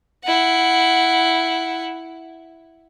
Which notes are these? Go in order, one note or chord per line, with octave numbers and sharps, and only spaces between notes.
E4 F#5